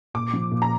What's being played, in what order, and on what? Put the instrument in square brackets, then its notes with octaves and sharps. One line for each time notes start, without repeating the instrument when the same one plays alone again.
[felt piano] A#2 [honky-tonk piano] D6
[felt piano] F3
A#2
[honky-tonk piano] A#5